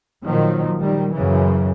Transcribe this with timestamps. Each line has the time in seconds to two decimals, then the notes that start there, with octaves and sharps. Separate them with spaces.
0.24 A#2 D#3 F3 F#3
0.78 D#3 G3
1.14 F#2 C#3 E3